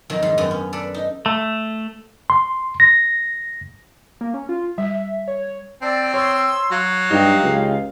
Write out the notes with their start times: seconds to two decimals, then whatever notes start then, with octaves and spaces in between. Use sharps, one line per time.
0.10 F2 D#3 F#3
0.23 G#2
0.38 F#2 B3 C4
0.51 C#4
0.73 A4 B4 D5
0.94 D#4
1.26 A3
2.30 C6
2.80 A#6
4.21 A#3
4.34 C#4
4.49 F4
4.78 G3 E5
5.28 C#5
5.82 C4 D5 A5 E6
6.14 C#5 C6 D#6 E6
6.72 F#3 F5
7.10 G2 D#4 G4
7.43 C#2